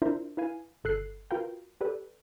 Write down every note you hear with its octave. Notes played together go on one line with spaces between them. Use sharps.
D4 E4 F4 A#4 C5 E5
E4 B4 F5 G#5
G1 A4 F#6 C7
F4 F#4 A#4 B4 F5 G5
G4 A4 B4 D5